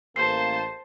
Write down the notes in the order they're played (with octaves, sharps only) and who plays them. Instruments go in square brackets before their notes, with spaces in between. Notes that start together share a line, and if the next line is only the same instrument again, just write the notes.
[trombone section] A1 A#3 [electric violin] C5 A5 [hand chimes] C7